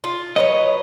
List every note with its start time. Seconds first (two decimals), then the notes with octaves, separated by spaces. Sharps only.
0.04 F4
0.36 F#3 B4 C#5 D#5